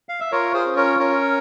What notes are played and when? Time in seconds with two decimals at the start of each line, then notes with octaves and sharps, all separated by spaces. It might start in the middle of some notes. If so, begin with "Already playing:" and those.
0.09 F5
0.20 E5
0.32 F4 A#4 C#5
0.54 G#4 C5
0.66 C#4
0.76 A#4 C#5
0.99 C#4 A#4 C#5